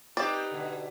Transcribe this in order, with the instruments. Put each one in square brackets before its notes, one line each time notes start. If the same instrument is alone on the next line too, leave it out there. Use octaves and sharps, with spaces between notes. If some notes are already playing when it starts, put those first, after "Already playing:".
[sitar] C4 G4 [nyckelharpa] D#4 B4 [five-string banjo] D5
[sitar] B2 D3